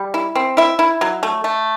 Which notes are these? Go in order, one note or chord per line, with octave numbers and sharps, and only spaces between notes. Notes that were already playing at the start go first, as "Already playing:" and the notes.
Already playing: G3
E4
C4
E4 E5
E4
F#3
A3
A3